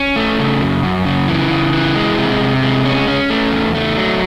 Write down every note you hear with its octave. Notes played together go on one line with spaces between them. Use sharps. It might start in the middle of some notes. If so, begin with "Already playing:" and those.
Already playing: C#4
A3
C#3
F#2
F#2
C#3
E3
C#3
E3
G#3
C3
C3
G#3
C#4
C#4
A3
E2
A3
F#3